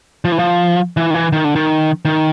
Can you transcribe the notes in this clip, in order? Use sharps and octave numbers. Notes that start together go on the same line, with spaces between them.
F3
E3
F3
E3
D#3
E3
D#3
D3
D#3
D#3